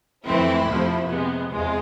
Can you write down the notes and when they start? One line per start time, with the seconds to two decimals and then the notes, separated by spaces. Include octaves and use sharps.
0.25 F2 E3 A3 C4 E4
0.66 F2 C3 F3 A3
1.08 C3 G#3 B3
1.49 E2 C3 G#3 F4